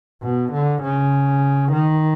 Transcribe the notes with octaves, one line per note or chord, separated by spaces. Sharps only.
B2
D3
C#3
D#3